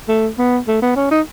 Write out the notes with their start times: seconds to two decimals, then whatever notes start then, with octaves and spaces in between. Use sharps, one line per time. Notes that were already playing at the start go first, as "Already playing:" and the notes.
0.08 A3
0.38 B3
0.68 A3
0.82 B3
0.96 C#4
1.11 D#4